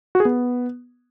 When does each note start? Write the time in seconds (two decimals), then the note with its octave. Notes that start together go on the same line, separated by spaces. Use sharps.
0.15 F#4
0.20 G#4
0.25 B3